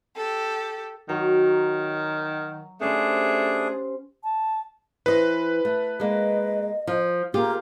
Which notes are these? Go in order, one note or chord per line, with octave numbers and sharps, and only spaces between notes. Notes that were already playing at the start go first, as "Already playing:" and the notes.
G4 A4
D#3 F#3
A3 C#4 D4 G4 G#4 C5
A5
E3 B4 C5 D#5
A3
G#3 A#3 D#5
F3
A#3 F4 G4 G#4